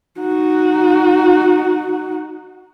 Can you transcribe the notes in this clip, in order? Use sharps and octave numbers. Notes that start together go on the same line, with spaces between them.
D#4 F#4